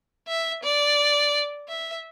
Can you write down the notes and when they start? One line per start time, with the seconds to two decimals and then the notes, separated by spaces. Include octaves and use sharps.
0.28 E5
0.63 D5
1.69 E5